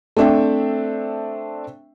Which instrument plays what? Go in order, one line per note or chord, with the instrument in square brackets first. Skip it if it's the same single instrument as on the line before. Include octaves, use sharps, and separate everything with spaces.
[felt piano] A3 C4 D4 E5 G5